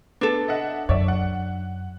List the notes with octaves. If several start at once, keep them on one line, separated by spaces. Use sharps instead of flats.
B3 D4 A4
D#5 E5 F#5
F#2 C#5 D5 E5
F#5